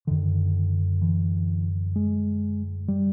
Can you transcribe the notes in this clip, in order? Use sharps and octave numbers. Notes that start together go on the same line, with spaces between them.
F#2 D3 D#3
E3
G#3
G3